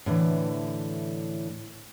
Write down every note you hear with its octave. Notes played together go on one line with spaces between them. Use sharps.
A2 D3 E3